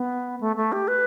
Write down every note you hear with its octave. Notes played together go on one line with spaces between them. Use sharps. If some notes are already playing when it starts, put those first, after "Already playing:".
Already playing: B3
A3
A3
G4
B4